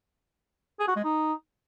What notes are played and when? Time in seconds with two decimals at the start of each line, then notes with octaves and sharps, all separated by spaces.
0.80 G#4
0.88 F#4
0.96 G#3
1.04 D#4